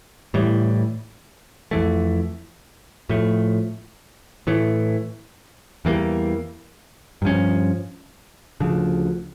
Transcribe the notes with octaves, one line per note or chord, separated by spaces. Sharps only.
A2 E3 G3
F2 E3 A3
A2 F3 A3
A2 E3 A3
E2 E3 G3 A#3
G2 F3 C#4
D2 C#3 F3